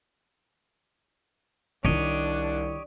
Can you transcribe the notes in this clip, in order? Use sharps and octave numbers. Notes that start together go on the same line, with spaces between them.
C2 D#3 D4 F4 G4 C#5 D#5